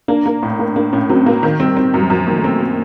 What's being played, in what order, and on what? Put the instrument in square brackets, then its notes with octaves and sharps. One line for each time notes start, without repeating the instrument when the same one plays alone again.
[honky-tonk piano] A#3 [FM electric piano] D4
[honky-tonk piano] A#3
A2
A#3
[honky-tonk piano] A#3 [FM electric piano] D4
[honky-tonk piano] A2 [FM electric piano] C#4
[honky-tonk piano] F#3 [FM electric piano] C4
[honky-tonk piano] A#3 [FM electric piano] B3
[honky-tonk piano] D#3 [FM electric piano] C4
[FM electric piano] G3 [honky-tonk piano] C4
[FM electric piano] G3 [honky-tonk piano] C4
[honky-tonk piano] F#2 [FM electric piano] G3
[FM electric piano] F#3
[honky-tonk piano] F#2 [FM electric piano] F3
[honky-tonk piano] D#3 [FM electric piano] A#3
[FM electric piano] A3
[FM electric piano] A#3 [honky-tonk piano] C4
[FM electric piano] A#3